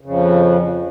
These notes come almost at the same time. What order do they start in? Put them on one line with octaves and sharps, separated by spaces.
C#3 F2 F3